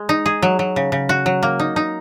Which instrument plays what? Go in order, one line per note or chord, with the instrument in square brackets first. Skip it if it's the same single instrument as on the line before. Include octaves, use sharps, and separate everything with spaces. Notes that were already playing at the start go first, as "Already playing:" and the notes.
Already playing: [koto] G#3
D#4
G#4
F#3
F#3
C#3
C#3
F#4
F#3
A#3
D#4
D#4